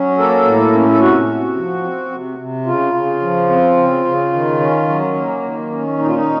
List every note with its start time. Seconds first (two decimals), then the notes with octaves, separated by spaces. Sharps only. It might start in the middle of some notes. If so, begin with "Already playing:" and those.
Already playing: F#3 C#4
0.18 A#3 A4
0.45 A2
0.73 C#4
0.91 A4
1.00 C3 F#4
1.28 C3
1.56 F3
1.83 C4
2.12 C3
2.38 C3
2.66 C#3 F4
2.94 C#3
3.22 F3
3.50 C4
3.77 C#3
4.05 C#3
4.33 D#3
4.60 C#4
4.88 F#3
5.15 A#3
5.43 D#3
5.71 C#4
5.99 A#2 D#4
6.06 F4
6.15 D#4